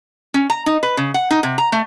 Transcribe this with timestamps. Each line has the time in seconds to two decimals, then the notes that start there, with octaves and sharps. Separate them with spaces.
0.34 C#4
0.50 A#5
0.66 D#4
0.83 B4
0.97 C#3
1.14 F#5
1.31 D#4
1.43 C3
1.58 A#5
1.72 A3